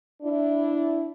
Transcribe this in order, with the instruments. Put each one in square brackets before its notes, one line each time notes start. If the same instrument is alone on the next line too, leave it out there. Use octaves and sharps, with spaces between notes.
[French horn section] D4 E4